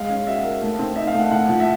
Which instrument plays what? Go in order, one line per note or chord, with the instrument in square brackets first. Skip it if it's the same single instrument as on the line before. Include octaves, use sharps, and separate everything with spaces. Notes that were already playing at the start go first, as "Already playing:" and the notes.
Already playing: [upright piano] G#3 [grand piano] F5
[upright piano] C#4
[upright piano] F#4 [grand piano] E5
[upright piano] A#4
A3
C4
[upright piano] D#4 [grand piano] E5
[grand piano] F5
[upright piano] A3 [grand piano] F#5
[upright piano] A2 [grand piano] F#5
[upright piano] F3
[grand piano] E5